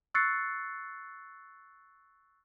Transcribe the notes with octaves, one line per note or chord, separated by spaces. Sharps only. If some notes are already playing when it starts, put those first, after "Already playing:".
C#6 E6 F#6 A6 C7 C#7